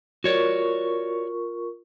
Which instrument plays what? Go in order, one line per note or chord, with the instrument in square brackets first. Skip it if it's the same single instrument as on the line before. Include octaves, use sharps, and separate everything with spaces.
[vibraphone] F4 A#4 C#6 [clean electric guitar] F#4 C#5 D5